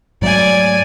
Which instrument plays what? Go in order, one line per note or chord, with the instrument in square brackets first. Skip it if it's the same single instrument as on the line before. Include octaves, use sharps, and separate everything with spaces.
[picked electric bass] G#2 F#3 A3 [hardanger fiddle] D5 G#5